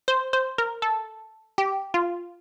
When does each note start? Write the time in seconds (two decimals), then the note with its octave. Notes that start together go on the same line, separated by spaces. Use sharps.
0.08 C5
0.33 C5
0.58 A#4
0.82 A4
1.58 G4
1.94 F4